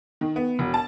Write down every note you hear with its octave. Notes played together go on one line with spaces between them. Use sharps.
D#3
B3
E1
A5